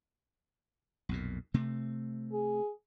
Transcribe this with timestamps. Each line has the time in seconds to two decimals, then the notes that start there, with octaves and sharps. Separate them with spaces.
1.09 B1 F2 A#2
1.54 C3 A3 C4
2.33 G#4